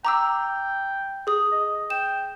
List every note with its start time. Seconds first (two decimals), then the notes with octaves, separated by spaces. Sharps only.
0.05 G5 A#5 D6 E6
1.27 G#4 D#6
1.52 D#5
1.90 G5 E7